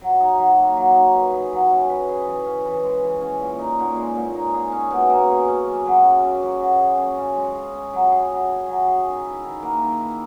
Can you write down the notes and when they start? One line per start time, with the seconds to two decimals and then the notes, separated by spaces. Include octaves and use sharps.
0.01 F#3
0.20 D#4
0.39 F#3
0.58 A#3
0.77 F#3
0.96 D#4
1.14 B4
1.34 G#4
1.52 F#3
1.70 C#4
1.89 B4
2.08 G#4
2.27 E3
2.46 C#4
2.65 E3
2.83 G#3
3.03 E3
3.21 C#4
3.40 A#2
3.59 D#4
3.79 A#2
3.97 G#3
4.15 A#2
4.35 D#4
4.54 G#4
4.72 C#4
4.91 B2
5.10 A#3
5.30 G#4
5.48 C#4
5.67 F#2
5.86 F#3
6.04 F#2
6.23 C#3
6.43 F#2
6.60 F#3
6.80 G#4
6.98 C#4
7.18 C#3
7.36 G#3
7.55 G#4
7.74 C#4
7.93 F#3
8.12 G#4
8.31 F#3
8.50 C#4
8.68 F#3
8.88 G#4
9.07 D#3
9.26 E4
9.44 D#3
9.63 A#3
9.82 D#3
10.01 E4